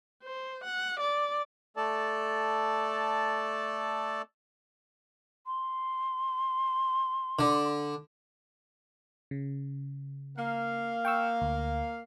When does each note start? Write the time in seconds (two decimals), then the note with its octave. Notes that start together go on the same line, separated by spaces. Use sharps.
0.23 C5
0.64 F#5
1.00 D5
1.77 A3 A4 D5 A5
5.46 C6
7.39 D3
9.31 C#3
10.38 A#3 F5
11.05 G5 C#6 E6
11.41 D2